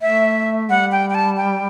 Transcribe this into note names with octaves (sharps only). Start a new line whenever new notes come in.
A3 E5
G3 F#5
G5
G5
A5
G5